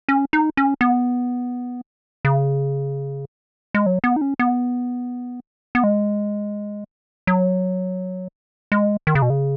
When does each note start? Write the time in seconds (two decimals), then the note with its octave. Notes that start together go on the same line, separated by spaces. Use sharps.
0.09 C#4
0.33 D#4
0.57 C#4
0.81 B3
2.25 C#3
3.74 G#3
3.86 F#3
4.04 B3
4.16 D#4
4.21 C#4
4.39 B3
5.75 B3
5.84 G#3
7.27 F#3
8.72 G#3
9.07 D#3
9.15 C#3
9.22 B2
9.30 C#3